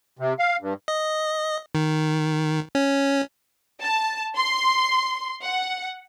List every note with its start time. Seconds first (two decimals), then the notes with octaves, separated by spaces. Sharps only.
0.19 C3
0.39 F5
0.61 G2
0.88 D#5
1.75 D#3
2.75 C#4
3.82 A5
4.35 C6
5.44 F#5